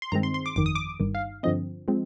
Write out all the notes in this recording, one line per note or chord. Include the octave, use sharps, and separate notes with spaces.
C6
G2 D#3 G#3 C4 A#5
C6
C6
D6
G1 F2 D#3 D6
D#6
D6
G1 G2 D#3
F5
G2 D3 F3 C4 D#5
F3 G#3 C4